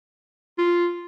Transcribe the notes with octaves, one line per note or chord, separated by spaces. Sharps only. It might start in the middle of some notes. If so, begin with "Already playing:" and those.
F4